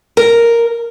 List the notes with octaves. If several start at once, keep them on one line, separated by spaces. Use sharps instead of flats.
A#4